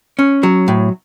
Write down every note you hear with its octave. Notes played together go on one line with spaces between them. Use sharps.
C#4
F#3
A2